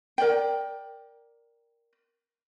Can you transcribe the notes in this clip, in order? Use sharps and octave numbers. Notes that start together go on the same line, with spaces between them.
A#4 D5 G5